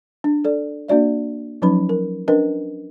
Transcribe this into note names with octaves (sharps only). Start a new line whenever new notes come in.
D4
A4 D5
A#3 D4 F#4 D5 E5
F3 F#3 C#4 D#4 B4 B5
A#4
C#4 D4 A#4 B4 D#5 G5